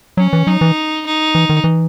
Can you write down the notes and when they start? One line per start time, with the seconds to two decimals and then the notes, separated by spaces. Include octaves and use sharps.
0.17 F#3 C#4
0.33 E3
0.47 F#3 D#4
0.61 E3
1.06 D#4
1.35 E3
1.49 D#3
1.64 E3